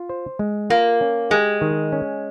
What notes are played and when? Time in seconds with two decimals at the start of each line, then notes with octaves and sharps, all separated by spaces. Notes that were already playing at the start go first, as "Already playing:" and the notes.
Already playing: F4
0.09 C5
0.39 G#3
0.70 A#3 F4
1.01 C#4
1.30 G#3 G4
1.61 D#3
1.92 C#4